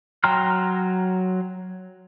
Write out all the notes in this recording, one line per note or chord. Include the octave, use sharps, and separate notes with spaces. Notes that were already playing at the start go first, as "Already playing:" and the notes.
F#3 G5 A#5 C6 F6